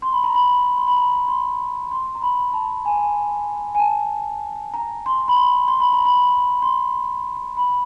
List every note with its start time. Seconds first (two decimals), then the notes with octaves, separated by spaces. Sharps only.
0.02 C6
0.13 B5
0.24 A#5
0.35 B5
0.77 C6
0.87 B5
0.97 A#5
1.28 C6
1.91 C6
2.15 A#5
2.22 B5
2.53 A5
2.85 G#5
3.75 G#5
3.79 A5
4.74 A#5
5.06 C6
5.28 B5
5.36 C6
5.68 C6
5.80 B5
5.93 A#5
6.05 B5
6.62 C6
7.57 B5